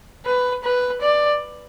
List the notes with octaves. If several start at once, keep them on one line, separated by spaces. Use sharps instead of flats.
B4
B4
D5